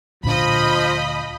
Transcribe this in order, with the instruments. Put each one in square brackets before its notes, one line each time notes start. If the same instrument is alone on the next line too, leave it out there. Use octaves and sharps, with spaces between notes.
[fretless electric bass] D2 A#2 D4 [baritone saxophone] F3 [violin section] D#5 B5